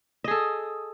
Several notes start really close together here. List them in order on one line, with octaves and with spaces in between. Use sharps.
D#5 G#4 A4